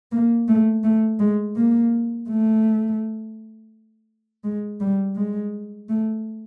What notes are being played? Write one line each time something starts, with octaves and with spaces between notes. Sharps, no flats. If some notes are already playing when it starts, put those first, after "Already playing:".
A#3
A3
A3
G#3
A#3
A3
G#3
G3
G#3
A3